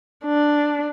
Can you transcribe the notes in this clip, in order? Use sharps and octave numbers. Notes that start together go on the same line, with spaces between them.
D4